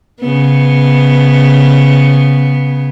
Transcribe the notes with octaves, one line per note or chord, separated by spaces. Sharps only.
C#3 B3